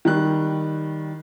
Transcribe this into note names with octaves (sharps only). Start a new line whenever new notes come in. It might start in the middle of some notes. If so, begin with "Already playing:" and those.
D#3 G3 F#6